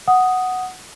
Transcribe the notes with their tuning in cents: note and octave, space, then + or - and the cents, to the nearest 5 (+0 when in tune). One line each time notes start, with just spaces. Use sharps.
F#5 +0 D#6 +0